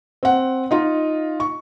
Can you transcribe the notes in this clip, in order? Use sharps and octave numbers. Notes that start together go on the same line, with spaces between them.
C4 F#5
D#4 F4 D#5
C#6